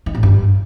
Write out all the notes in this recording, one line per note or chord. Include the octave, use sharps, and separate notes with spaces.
D#3
A2
G2